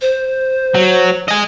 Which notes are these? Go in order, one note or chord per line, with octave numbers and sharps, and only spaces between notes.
C5
F#3
D#5 G#5